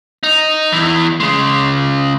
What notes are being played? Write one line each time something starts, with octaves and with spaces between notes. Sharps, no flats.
D#4
E2 E3
C#3 G#3